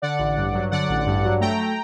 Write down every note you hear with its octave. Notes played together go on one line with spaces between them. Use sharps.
D3 D5 F#5
A1
G2
F#3
D3 D5 F#5
A1
G2
F#3
A3 G5 A#5